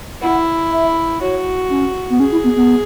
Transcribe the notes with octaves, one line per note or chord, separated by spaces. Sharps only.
E4 F#5
E5
F#4 C#5
C#4
B3
C#4 G#4
E4
B3
B3